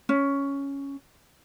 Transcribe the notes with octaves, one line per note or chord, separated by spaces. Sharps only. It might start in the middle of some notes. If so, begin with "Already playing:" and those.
C#4